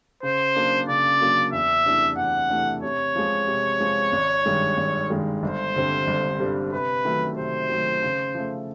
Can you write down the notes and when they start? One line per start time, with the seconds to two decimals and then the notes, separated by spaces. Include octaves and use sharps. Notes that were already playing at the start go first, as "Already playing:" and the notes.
0.23 C#3 C5
0.55 F#3 A#3 D4
0.88 C#3 D5
1.20 F#3 A#3 D4
1.53 E2 E5
1.85 C3 E3 A3 D4
2.18 E2 F#5
2.50 C3 E3 A3 D4
2.83 C3 C#5
3.16 F3 G#3
3.47 C3
3.80 F3 G#3
4.12 G#1
4.46 G2 D#3 G#3
4.77 G#1
5.10 G2 D#3 G#3
5.43 G1 C5
5.75 G2 D3 G3 C4
6.07 G1
6.40 G2 D3 G3 C4
6.72 C3 B4
7.05 D#3 F#3 A3
7.37 C3 C5
7.70 D#3 F#3 A3
8.03 C#3
8.35 F3 A3